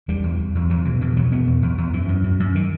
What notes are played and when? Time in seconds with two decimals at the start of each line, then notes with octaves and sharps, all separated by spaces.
0.08 E2 G3
0.24 E2
0.39 E2
0.55 E2
0.70 E2 F#3
0.85 B2 E3
1.01 B2 E3
1.16 E2 F#3
1.31 B2 B3
1.47 E2
1.62 E2
1.78 E2
1.93 F#2 E3
2.08 F#2
2.24 F#2
2.40 F#2
2.55 D#3